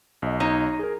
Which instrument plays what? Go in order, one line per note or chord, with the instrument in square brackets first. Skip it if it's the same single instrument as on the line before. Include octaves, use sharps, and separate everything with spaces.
[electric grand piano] B1 D#5
[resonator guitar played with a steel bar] D#4 C#5
[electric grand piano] G#4 A#4